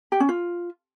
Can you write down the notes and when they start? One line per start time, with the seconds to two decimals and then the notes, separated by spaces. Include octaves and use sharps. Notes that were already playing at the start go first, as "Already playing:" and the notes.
0.12 G4
0.20 C#4
0.29 F4